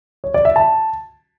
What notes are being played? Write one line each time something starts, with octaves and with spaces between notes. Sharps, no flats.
C#5
D5
E5
A5